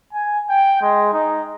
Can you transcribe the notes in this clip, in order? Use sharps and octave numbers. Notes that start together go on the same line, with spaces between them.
G#5
G5
G#3
D#4